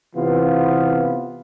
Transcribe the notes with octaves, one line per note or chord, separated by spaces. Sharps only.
C3 E3 B3 F4